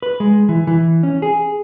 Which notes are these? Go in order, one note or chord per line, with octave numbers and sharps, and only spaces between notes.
B4
G#3
E3
E3
C#4
G#4